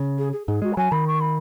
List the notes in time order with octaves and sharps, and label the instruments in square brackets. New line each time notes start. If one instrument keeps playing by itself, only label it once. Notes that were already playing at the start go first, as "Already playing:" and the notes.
Already playing: [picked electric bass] C#3
[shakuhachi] G#4
G#4
[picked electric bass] G#2 [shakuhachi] G#4
[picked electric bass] G#3 [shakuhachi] F#4
[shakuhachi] B5
[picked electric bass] F#3 [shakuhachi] G#5
[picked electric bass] D#3 [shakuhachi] B5
[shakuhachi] C#6
B5